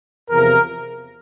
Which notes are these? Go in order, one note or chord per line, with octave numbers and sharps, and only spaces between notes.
E2 C3 F3 A#4